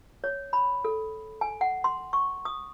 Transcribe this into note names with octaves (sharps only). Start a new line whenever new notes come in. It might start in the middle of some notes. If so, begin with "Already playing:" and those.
C#5
B5
A4
G#5
F#5
C6
C#6
D#6